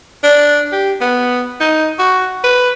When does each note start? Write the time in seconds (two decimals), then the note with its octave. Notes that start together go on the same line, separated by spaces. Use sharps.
0.24 D4
0.72 G4
1.01 B3
1.60 D#4
1.99 F#4
2.44 B4